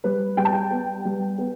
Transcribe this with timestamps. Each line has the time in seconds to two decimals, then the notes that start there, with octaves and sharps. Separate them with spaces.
0.04 G3 B4
0.37 G3 G5
0.45 A5
0.53 G5
0.71 B3
1.05 G3
1.38 B3